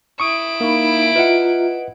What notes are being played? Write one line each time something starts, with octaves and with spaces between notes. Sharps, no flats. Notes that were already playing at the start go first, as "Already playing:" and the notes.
E4 C#6 D#6 D7
A#3 D#4 B5
F4 B4 D#5 E5 F#5 A#5